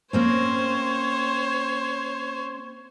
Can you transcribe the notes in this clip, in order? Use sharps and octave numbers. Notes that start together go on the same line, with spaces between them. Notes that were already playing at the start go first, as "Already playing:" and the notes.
A#3 C4 C#4 C5 C#5